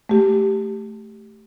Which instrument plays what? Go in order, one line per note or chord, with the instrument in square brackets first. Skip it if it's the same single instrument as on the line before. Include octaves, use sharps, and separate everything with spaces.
[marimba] A3 G4